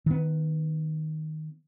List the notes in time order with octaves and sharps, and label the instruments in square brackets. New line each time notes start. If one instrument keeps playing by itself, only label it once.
[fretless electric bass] D#3 B3